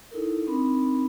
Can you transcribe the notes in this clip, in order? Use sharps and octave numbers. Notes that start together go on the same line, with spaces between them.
D#4 E4 A4 A#4
C4 D4 D#4 A#4 B5